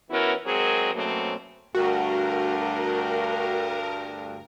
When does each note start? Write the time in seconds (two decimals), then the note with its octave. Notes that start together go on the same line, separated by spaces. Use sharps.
0.11 E3 B3 C#4 E4 F#4 A#4
0.47 F#3 G#3 C4 G#4 A#4
0.95 B2 F#3 A3 A#3 C4 C#4
1.75 D2 G2 F#4 A#4